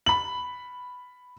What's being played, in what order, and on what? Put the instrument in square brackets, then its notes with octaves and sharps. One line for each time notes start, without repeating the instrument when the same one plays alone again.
[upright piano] B5 F#7